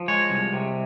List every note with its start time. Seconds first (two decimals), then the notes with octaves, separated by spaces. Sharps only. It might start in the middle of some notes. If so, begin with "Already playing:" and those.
Already playing: F3
0.08 G#3 C#5
0.31 C2
0.53 C3